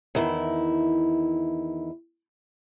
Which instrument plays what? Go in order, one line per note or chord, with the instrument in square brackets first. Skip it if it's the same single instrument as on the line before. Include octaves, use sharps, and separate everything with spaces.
[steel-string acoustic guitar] E2 D#3 E4